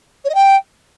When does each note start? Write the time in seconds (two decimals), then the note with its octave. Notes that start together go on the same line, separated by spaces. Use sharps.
0.24 C#5
0.29 D#5
0.35 G5